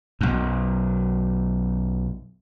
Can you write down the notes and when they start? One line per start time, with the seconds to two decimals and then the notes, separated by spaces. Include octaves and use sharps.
0.21 B1 F#2